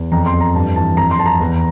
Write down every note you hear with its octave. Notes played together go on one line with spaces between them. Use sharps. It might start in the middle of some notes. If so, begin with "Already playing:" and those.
Already playing: E2
F2 A#5
C6
F2
A#5
G2 A5
E3 A5
F2 A#5
C6
F2 A5
A#5
E2